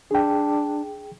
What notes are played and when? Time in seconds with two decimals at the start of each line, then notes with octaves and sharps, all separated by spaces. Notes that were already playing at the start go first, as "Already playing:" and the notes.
0.11 D4 G#4 G5